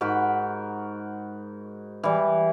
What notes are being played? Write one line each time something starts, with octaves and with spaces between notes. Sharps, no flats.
G#2 F#4 A#4 B5
E3 G3